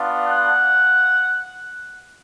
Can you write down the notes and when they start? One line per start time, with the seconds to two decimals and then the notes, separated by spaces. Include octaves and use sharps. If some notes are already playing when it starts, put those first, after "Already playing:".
Already playing: B3 D4 F4
0.27 F#5